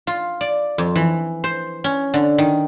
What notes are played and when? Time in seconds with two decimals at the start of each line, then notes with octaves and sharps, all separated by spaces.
0.07 F4
0.41 D5
0.78 F2
0.95 E3
1.44 C5
1.84 C#4
2.14 D3
2.38 D#3